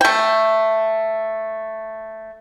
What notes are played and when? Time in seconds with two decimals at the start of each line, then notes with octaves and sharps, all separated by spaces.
0.01 A3 G5